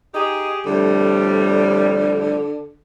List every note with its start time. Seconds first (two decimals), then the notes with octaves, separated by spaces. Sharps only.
0.14 D#4 G4 G#4
0.66 F2 A2 D3 G3